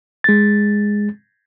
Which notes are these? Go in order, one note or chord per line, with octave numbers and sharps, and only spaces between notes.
G#3 A6